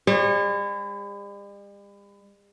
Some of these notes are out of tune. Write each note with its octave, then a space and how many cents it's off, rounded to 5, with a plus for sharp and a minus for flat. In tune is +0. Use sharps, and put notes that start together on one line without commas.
G3 +45 C#5 -35